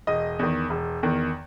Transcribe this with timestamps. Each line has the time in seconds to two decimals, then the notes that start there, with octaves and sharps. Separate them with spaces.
0.07 E1 D#5
0.39 E2 D#3
0.70 E1
1.03 E2 D#3